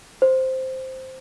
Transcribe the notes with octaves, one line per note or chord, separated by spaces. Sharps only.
C5